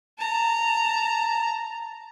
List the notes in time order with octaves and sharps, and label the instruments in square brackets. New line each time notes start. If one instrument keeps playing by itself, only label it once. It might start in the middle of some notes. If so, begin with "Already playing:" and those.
[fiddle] A5 A#5